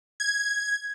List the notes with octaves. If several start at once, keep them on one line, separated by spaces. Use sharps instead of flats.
G#6